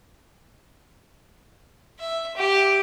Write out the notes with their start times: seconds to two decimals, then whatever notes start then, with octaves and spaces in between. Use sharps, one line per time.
2.00 E5
2.37 G4